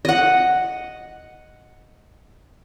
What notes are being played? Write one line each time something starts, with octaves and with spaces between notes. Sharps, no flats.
D#5 F#5